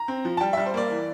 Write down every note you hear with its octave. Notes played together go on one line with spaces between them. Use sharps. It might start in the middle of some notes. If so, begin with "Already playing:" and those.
Already playing: A#5
C4
F3
A5
G3 G5
G3 E5
C5
A#3 D5
E3